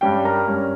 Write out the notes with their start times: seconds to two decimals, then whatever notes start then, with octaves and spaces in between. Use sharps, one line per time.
0.01 G2 G3 C#4 G4 G5
0.24 A#4 A#5
0.48 G2 G3 C#4